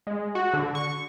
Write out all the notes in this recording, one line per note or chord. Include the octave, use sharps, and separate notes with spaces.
G#3
F#4
D3
C#6